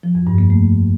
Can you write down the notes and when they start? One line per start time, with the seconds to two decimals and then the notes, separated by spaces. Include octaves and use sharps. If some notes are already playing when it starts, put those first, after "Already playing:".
0.03 F3
0.15 F2
0.27 G2
0.38 A#3
0.50 A3